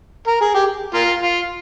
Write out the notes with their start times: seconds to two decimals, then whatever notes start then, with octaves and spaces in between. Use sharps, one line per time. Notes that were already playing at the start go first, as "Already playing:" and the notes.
0.27 A#4
0.41 G#4
0.54 G4
0.94 A#3 F4
1.21 F4